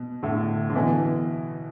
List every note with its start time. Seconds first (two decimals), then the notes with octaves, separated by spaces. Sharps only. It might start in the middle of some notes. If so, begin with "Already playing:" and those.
Already playing: B2
0.23 A2 D3
0.70 D3
0.75 B2 E3